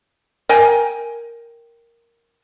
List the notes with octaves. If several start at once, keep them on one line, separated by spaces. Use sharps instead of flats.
A#4 G5 G#5